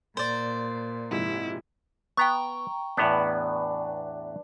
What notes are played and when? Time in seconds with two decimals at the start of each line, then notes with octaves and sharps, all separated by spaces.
0.17 A#2 C5 D5
1.11 G#2 C3 F3 E4
2.17 B3 G5 A#5 C#6
2.97 E2 A2 B3 D4 B4